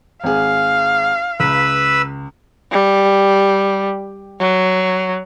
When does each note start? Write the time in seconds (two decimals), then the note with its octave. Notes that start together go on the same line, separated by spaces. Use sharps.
0.24 G#1 G#4 F5
1.40 C#2 B4 B5 E6
2.71 G3
4.40 F#3